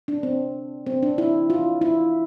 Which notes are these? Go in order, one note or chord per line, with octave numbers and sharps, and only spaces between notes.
D4
C4
C4
D4
E4
F4
E4